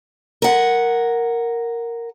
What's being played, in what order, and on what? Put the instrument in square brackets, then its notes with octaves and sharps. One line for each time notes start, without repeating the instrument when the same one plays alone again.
[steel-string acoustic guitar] A#4 F#5